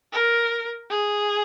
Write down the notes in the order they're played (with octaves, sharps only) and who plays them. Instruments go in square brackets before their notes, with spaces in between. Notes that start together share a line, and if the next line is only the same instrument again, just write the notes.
[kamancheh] A#4
G#4